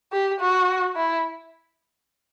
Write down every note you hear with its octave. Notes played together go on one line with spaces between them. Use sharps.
G4
F#4
E4